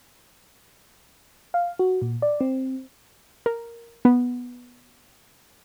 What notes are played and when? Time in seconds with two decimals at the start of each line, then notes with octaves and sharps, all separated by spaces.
1.54 F5
1.79 F#4
2.02 A#2
2.22 D5
2.41 C4
3.46 A#4
4.05 B3